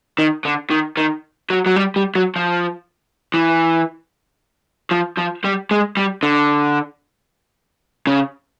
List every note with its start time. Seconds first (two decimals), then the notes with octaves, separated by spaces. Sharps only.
0.19 D#3
0.45 D3
0.71 D#3
0.97 D#3
1.50 F#3
1.66 F#3
1.76 G3
1.96 G3
2.15 F#3
2.36 F3
3.34 E3
4.92 F3
5.18 F3
5.45 G3
5.71 G#3
5.97 G3
6.23 D3
8.07 C#3